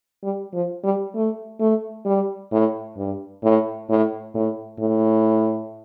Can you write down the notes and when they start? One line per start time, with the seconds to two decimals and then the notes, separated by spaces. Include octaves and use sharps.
0.23 G3
0.54 F3
0.84 G3
1.15 A3
1.60 A3
2.05 G3
2.51 A2
2.97 G2
3.43 A2
3.89 A2
4.34 A2
4.79 A2